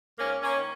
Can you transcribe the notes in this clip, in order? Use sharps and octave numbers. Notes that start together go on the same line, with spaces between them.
G#2 A#3 C#4
A#3 C#4
D#3